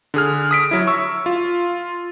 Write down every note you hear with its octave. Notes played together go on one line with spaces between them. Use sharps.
D3 G#4 F6
D#6 B6 D7
F#3 E4
C#6 E6
F4